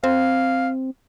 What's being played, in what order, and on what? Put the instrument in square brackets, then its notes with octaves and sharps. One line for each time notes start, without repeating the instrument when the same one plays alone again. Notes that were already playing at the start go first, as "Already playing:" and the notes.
[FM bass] C4 [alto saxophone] F5